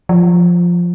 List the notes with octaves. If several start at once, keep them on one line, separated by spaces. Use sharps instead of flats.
F3